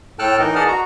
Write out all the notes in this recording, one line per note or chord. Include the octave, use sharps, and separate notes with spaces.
A2 A4 G5 A5 F6 F#6
E3 D#4 A#4 D#5
G#4 D5 D#5 F#5 A5 F6
F#4 A#5